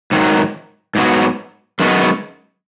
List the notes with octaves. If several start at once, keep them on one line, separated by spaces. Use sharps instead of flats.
G#2 D#3 F#3
G#2 F#3 B3 F#4
F#2 D#3 G#3 B3 F#4